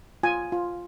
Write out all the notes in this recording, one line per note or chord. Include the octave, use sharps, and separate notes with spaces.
F4 G#5
F4